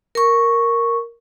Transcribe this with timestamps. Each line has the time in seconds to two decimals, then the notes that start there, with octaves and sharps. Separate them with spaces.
0.15 A#4 C#6